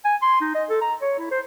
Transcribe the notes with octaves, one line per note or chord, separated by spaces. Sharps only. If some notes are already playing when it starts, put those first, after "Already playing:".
G#5
C6
D#4
D#5
A4
A#5
C#5
E4
C5